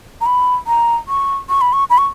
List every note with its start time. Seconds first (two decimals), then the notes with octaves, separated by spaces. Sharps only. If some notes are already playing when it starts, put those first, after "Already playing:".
0.21 A#5
0.26 B5
0.67 A#5
1.08 C#6
1.49 C#6
1.61 B5
1.73 C#6
1.90 B5
1.98 C#6